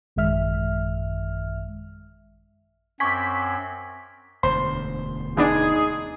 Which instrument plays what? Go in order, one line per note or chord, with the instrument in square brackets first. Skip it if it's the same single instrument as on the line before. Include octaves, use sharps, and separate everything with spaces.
[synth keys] A1 F#2 D#3 G#3 E5 F6
[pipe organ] F#2 C4 [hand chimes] G#5 [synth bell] C#6 D6 G#6 [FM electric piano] B6
[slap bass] E1 D2 [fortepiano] C5
[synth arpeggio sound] E3 B3 D4 [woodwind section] D#4 G#4